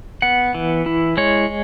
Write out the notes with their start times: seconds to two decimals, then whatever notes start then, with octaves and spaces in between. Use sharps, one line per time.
0.22 B3 F#5
0.55 E3
0.86 E4
1.17 G#3 C#5